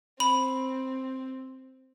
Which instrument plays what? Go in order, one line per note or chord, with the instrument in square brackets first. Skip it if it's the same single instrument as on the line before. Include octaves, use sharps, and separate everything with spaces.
[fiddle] C4 [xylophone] B5